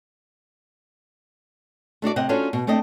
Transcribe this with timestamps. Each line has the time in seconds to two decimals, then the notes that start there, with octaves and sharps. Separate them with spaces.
2.02 A3 D4 F#4 D5
2.16 C3 C5 D#5 F#5
2.29 C#4 D4 F4 F#4 A4 C#5
2.53 B2
2.67 A3 C4 D4 D#5